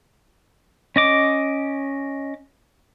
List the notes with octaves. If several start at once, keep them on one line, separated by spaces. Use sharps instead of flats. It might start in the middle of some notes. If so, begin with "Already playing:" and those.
C#4 D#5 D6